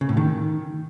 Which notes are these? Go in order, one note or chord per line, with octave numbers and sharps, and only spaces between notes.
C#3
A2
D#3